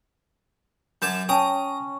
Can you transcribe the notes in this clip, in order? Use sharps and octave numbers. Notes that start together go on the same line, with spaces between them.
F#2 A5 D6 G6 G#6
C#4 G5 A5 A#5 D#6